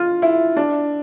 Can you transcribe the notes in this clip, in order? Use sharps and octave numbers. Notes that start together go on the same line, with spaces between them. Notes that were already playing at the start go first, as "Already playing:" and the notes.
Already playing: F4
E4
D4